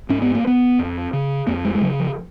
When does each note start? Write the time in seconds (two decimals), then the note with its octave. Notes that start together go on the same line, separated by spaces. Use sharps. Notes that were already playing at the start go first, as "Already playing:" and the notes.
0.09 G#2 C#4
0.22 B3
0.35 A#3
0.47 B3
0.79 F2
1.13 C#3
1.47 F2 A#3
1.65 G#3
1.75 G#3
1.81 C#3 F#3
1.99 F3